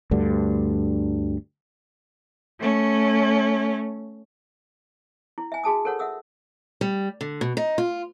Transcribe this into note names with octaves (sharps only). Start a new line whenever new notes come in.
D2 G2 D3
A3 C#4
E4
E5 G#5
F#4 G#4 A5 D#6
A4 A#4 C#5 F#5
E5 F#5 D#6 E6
G3
D3
B2
D#4
F4